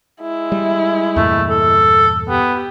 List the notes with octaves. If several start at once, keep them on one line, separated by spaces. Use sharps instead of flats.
G#3 E4
G3
E2 G2 A#2 A3
A4
B3 G4